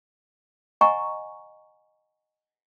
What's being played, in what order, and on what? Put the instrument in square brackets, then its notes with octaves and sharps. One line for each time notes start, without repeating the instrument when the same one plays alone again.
[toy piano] D#5 F#5 G#5 A#5 C#6